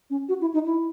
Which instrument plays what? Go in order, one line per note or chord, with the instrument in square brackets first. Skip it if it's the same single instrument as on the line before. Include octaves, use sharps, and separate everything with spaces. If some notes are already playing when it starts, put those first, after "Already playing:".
[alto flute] C#4
F#4
E4
D#4
E4